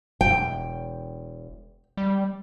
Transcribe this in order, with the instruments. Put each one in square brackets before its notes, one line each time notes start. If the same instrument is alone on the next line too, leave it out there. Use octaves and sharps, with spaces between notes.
[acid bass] E1 [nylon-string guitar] G5
[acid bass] G3